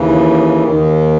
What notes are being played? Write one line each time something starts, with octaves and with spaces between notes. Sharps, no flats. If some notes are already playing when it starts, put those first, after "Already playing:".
Already playing: D#2 C#3 E3
D#2 D#3